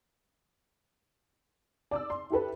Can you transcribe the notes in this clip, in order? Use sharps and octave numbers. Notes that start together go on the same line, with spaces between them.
D5 D6 E6
C6
E4 G4 A4 B4